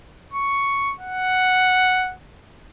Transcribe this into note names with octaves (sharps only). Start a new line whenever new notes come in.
C#6
F#5